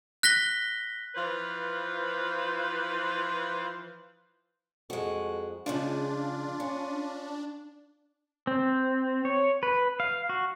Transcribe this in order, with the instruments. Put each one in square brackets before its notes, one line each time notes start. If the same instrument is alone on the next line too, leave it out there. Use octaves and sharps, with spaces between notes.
[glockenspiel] F#6 A#6 B6 G7
[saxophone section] E3 F3 F4 B4 C5
[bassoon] F2 [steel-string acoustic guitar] G#3 F#4
[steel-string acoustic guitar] C#3 F3 G#3 [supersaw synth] D4 [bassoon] F4
[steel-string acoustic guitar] C#4
[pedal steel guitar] C4
C#5
B4
F5
F#4